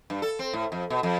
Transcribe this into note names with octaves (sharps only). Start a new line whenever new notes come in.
G2
A4
C4
A2
F2
B2
F2